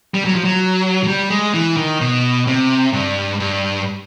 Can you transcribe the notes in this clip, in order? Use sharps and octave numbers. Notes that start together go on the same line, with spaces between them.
G3
F#3
F3
F#3
F#3
G3
G#3
E3
D#3
B2
C3
G2
G2